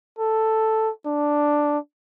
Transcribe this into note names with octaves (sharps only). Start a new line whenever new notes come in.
A4
D4